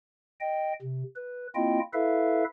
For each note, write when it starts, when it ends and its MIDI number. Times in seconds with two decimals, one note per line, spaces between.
0.41 0.73 75
0.41 0.73 79
0.82 1.03 48
1.16 1.47 71
1.55 1.80 58
1.55 1.80 60
1.55 1.80 64
1.55 1.80 65
1.55 1.80 75
1.55 1.80 79
1.93 2.44 64
1.93 2.44 69
1.93 2.44 71
1.93 2.44 76
1.93 2.44 77